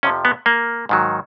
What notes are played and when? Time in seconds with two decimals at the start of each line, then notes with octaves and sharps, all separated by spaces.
0.03 F2 C3 F3 C#4
0.25 B3
0.46 A#3
0.89 G#2 D#3 F#3